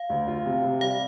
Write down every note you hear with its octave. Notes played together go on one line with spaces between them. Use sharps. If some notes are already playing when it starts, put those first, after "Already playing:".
Already playing: F5
D2
F4
C3
C3
G3 F5